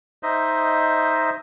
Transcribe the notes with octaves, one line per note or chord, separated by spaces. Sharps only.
D#4 C5 D#5 E5